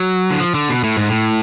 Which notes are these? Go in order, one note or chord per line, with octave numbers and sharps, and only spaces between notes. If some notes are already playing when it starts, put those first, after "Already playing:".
Already playing: F#3
D3
F3
D3
B2
A2
G#2
A2